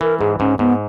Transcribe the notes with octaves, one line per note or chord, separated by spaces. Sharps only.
E3 A#4
G#2 G#4
G#2 C#4
G#2 B3